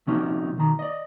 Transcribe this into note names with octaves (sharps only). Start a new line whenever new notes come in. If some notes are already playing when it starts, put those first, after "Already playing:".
C3 F3 F#3 C#4 D#4
B1 D#3 A#5
D5 D#5